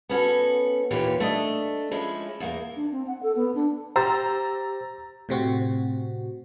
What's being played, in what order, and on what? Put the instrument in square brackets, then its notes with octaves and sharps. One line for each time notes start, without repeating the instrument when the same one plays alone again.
[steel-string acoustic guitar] B3 C#4 F#4 A4
D#2 A#2 E3 G4 C#5
A3 D4 D#5
F3 G#3 C#4 E4
E2 A#3
[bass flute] D4
C4
F#5
A4
B3
D4
[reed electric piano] G4 C5 [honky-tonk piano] A#5 E6 A6
[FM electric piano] A2 C3 C4 F#4